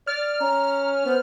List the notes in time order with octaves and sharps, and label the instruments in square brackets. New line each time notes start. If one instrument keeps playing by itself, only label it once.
[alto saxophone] D5 [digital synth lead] F6
[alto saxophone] C#4 [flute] A#5
[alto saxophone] B3 [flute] C5